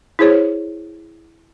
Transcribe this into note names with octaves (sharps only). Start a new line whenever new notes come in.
E4 G#4 C5 C#5